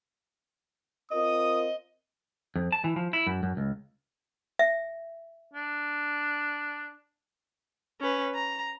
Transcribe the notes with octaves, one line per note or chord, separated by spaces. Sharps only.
C4 F4 A#4 D#5 D#6
F2
A5
E3
F3
E4
F#2
F#2
C#2
E5
D4
C#4 B4
A#5